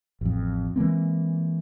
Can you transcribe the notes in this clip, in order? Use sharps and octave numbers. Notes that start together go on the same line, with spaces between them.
A1 F2
E3 G#3 A#3 C4